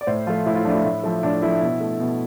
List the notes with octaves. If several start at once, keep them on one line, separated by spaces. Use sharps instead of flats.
D5
A2 C5
F3 A3 F4
A2 E4
F4
F3 A3 D4
E4
A2
F3 A3
A2 D4
F3 A3 E4
B2
A3
B2